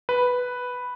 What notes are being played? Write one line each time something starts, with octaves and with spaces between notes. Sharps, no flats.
B4